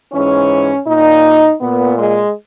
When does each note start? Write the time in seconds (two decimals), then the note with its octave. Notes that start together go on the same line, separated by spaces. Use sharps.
0.12 G#2 E3 C#4
0.86 A#2 D#4
1.60 A#2 B3
1.98 G#3